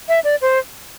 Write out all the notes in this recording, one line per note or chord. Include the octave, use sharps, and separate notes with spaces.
E5
D5
C5